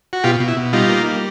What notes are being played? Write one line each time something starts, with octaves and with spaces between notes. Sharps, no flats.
F#4
B2 F4 G4
B2
E4
B2
G3 D#4 F4
A#3
G3